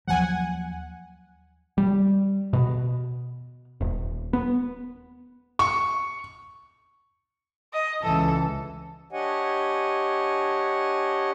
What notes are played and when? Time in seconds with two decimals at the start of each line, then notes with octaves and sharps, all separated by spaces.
0.07 D#2 F3 F#3 F#5 G#5
1.78 G3
2.53 B2
3.81 D#1
4.33 B3
5.59 C#6
7.73 D#5
8.03 C#2 E3 A4
9.12 D4 G4 C#5 D#5 F#5 G#5